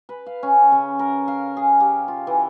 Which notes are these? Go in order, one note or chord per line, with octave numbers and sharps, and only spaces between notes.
B4
F5
C#4
C#3
A#4
F5
G#4
G4
F4
E3